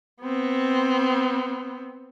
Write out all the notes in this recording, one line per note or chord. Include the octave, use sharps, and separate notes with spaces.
B3 C4